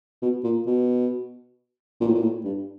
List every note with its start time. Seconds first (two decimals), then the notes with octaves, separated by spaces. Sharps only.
0.22 B2
0.44 A#2
0.67 B2
2.00 A#2
2.07 A2
2.15 A#2
2.22 A2
2.44 G2